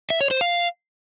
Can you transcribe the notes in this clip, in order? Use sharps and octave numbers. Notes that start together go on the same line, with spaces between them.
E5
C#5
C5
F5